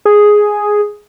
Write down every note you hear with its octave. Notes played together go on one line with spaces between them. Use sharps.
G#4